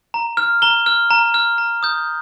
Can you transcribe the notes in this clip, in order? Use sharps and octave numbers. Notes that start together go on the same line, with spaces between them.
A#5
F6
A#5 G7
F6
A#5
F6
A#5
D#6 G6